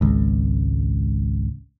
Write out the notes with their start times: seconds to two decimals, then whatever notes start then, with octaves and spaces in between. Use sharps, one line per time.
0.01 G#1 C#2